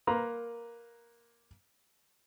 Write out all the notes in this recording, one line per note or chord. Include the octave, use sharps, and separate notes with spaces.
A#3 A#4 B4 A#5 C6